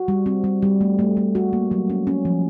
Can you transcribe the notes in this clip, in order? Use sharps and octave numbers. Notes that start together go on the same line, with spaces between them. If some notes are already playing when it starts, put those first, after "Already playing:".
Already playing: F#4
G3
C4
G3
G3
A3
A3
A3
F#4
A#3
F#3
C#4
C#4
F3